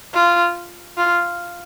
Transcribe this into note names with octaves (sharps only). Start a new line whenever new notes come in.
F4
F4